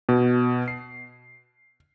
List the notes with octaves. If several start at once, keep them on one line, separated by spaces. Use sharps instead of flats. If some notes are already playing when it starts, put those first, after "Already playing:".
B2
C7